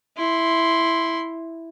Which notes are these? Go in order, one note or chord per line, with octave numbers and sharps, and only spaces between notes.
E4 C6